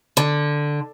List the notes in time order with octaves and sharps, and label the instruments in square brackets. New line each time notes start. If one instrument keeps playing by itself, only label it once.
[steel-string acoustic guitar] D3